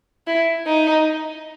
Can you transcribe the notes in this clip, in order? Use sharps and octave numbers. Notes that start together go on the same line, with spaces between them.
E4
D#4